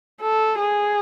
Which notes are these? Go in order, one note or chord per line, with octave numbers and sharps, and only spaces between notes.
A4
G#4